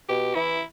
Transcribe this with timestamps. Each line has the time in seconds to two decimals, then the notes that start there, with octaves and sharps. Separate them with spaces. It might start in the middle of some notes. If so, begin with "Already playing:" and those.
0.09 B2 G4
0.35 E3 E4